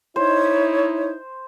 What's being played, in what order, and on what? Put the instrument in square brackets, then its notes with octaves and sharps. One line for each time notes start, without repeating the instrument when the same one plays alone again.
[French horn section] D#4 E4 [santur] C5 [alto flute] C#5